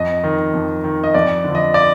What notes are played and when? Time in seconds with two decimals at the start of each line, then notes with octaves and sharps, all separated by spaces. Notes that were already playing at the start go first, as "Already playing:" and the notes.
Already playing: F2 D#5
0.24 D#3
0.54 F2
0.84 D#3
1.04 D#5
1.14 F2 D5
1.44 D3
1.49 F3
1.55 D#5
1.74 D5